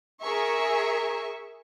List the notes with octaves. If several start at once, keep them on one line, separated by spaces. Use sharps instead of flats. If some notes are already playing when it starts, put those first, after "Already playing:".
G#4 A#4 E5 C#6